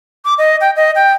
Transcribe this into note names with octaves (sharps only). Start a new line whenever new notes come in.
D6
D#5
G5
D#5
G5